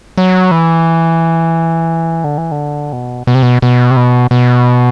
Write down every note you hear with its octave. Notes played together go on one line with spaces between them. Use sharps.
F#3
E3
D3
E3
D3
B2
B2
C3
B2
B2
C3
B2
B2